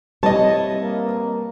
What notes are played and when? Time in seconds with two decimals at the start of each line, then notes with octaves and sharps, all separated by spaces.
0.23 G3 C4 E4 B4 C#5 D#5 A5
0.82 A#3